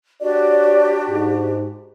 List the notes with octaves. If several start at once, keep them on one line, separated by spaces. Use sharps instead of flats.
D4 F#4 G4 C#5 D5
G#2